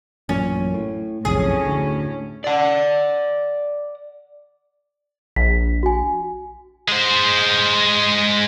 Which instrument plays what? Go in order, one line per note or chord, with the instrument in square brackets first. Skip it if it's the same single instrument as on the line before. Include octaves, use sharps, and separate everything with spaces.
[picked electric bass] A1 F#2 A#2 [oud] C#4
[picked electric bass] A2
[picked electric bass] F#1 B1 F2 [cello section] A2 C#4 [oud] G#4
[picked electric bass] D2
[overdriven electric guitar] D5 F#5
[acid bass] A#1 [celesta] B6
[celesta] F#4 G#5
[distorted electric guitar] G#3 C5